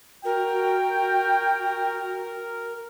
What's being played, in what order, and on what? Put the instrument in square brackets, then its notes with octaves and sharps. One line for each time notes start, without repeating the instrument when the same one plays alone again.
[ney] F#4 [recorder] A#4 [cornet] G5